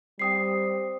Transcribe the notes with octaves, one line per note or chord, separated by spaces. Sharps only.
G3 C4 C5 G5 D#6 C7